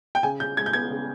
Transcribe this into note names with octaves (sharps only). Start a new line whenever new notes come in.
G5
C#3 G#5
C#3 G6
G#3 G#6
G6
B3 G#6
C#3